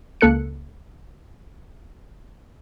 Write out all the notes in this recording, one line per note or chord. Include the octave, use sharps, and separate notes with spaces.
C#2 A#3 A4 F#6 C#7